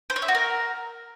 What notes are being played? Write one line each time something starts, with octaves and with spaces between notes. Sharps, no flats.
C5
C#5
E5
F#4
A#4